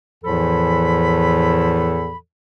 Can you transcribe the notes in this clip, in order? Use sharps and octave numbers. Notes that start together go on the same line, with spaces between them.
E2 A2 E3 F3 A4 B5